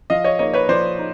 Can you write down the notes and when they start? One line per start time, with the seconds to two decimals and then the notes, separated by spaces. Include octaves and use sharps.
0.10 F3 D#5 F5
0.24 C#5 D#5
0.39 A#3 D#4 C#5 D#5
0.53 B4 C#5
0.69 F3 C5 D5
0.99 D#4